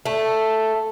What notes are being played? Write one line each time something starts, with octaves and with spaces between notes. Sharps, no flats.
A3